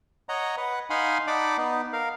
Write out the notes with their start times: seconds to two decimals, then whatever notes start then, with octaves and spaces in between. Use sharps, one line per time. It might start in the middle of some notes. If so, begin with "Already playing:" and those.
0.29 C#5 D#5 F#5 A#5
0.57 B4 F#5
0.90 D#4 F5 F#5 G#5 B5 C6
1.27 D#4 D5 F#5 A5 B5 D6
1.57 B3 D#4
1.93 A#4 F5